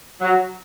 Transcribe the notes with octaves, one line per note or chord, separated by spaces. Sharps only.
F#3